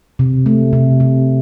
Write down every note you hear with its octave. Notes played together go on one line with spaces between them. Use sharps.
C3
A3
C3
C3